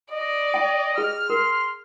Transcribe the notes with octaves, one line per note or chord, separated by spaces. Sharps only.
D5 D#5
G5
G#4 F6
A#4 C6